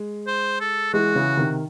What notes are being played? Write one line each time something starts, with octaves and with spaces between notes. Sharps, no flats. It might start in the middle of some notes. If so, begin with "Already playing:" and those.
Already playing: G#3
C5
A4
E3 G#3 F#4
C#3 E3
C3 D#3